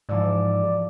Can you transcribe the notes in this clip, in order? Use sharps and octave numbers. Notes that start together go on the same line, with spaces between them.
G#2 E3 F3 D5 E6